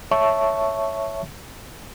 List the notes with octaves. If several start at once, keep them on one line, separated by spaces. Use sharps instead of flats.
C#5 E5 A5 C#6